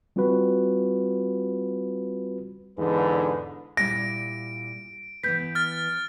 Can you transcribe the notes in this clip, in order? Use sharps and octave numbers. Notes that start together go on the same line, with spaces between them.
G3 C4 F4 F#4 B4
E2 G#2 D3 B4
A#2 G3 E4 A#6 D7
E3 B3 B4 G6 B6
F6 A6